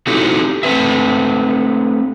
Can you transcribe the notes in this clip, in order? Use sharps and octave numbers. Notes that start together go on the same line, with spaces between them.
C4 D#4 E4 F#4 G4 A4
A3 C4 B4 E5